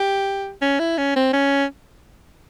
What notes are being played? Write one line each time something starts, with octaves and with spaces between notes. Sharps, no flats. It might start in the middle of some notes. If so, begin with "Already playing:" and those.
Already playing: G4
C#4
E4
C#4
C4
C#4